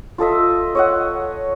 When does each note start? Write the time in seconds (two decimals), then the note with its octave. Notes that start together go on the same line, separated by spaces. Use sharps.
0.18 F4 A4 D#5 E5
0.75 C#5 D#5 F#5